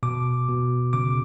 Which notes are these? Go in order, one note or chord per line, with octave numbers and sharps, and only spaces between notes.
B2 D6
B2
C#3 D6